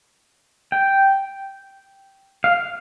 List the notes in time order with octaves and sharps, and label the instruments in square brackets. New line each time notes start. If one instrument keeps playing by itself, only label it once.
[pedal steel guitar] G5
F5